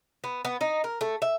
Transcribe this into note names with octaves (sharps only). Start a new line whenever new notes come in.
B3
B3
D#4
A#4
A3
E5